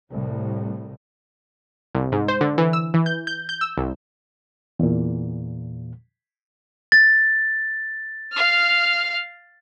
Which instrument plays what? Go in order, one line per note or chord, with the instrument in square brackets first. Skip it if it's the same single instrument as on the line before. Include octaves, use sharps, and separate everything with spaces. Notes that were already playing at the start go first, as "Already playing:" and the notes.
[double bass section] C2 A2
[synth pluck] C2
G#2
C5
D3
E3
E6
E3
G6
G6
G6
E6
C2
[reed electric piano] E2 A#2
[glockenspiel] A6
[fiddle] F5 F6